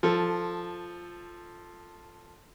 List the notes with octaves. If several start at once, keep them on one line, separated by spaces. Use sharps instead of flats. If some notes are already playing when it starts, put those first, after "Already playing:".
F3 A4